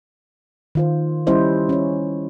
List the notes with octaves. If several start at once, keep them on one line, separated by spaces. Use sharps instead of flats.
D#3 F4 C5
G3 C#4 E4 G4 C5 D#5
C#4 C#5